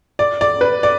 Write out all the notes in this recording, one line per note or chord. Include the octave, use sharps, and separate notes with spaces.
D5
D5
B4
D5